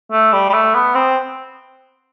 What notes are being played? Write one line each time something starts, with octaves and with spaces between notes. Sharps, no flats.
A3
G3
G3
A3
B3
C4